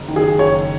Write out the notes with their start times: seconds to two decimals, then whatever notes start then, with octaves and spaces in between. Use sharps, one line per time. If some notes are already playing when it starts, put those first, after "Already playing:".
Already playing: F#1
0.08 D#3
0.16 G#4
0.39 F#1 C#5